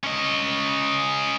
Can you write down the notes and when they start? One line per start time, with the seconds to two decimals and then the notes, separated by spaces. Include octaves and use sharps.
0.04 C#4 D#5